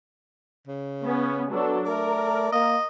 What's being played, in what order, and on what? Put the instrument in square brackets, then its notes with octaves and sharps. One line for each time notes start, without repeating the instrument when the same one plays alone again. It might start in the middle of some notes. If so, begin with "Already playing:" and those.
[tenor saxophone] C#3
[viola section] B3 C#4
[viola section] F#3 D4 A4 [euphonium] B3
[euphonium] A3 [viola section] A#4 [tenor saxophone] D5
[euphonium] A#3 [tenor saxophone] D#5